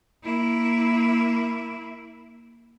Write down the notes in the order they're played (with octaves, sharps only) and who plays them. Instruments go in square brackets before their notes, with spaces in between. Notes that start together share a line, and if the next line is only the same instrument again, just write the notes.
[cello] A#3 E4